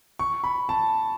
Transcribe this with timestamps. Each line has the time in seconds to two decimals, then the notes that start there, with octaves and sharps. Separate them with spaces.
0.19 C#6
0.44 B5
0.69 A5